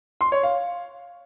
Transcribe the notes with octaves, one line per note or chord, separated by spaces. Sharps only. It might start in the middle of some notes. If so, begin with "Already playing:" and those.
C6
C#5
F5